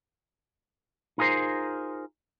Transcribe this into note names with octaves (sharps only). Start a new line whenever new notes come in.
D#4 F4 G#4 A#4 C5